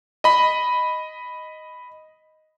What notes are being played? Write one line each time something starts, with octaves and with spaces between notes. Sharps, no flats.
D#5 B5